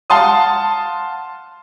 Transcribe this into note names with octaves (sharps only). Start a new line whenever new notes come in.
F5 F#5 A5 C6 D#6